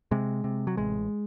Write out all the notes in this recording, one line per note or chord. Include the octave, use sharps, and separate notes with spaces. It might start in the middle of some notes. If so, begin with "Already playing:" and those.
C3 G#3
C3
F#3
A1 G#3